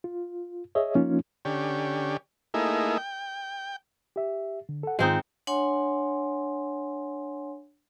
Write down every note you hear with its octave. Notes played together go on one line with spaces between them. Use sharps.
F4
G#4 C#5 D#5 E5
F3 A#3 C#4 D#4 F4
D3 C#4 G4
A3 A#3 D#4 E4 G#4
G5
G4 E5
D3
A4 F#5
G#2 D#3 G#3 C4 D#4 F4
D4 C#5 F#5 G#5 C6